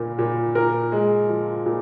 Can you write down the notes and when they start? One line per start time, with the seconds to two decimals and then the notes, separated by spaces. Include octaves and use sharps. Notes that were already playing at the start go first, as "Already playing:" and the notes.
Already playing: A#2 A#3
0.18 A#2
0.55 A#2 A#4
0.92 G#3
1.29 F3
1.66 A#2